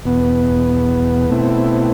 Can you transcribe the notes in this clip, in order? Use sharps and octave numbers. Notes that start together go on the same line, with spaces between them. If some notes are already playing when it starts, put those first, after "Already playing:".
E2 B2 B3
B2 A3 C4 E4